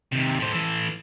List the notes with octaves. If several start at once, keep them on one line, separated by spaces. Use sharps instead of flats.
D#2 C3
A2 C5
E3 A4